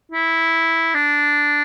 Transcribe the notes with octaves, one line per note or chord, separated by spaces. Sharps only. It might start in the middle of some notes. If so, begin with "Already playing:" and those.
E4
D4